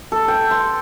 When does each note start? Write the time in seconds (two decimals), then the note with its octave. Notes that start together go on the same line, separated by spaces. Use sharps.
0.12 A4
0.28 G5
0.51 C6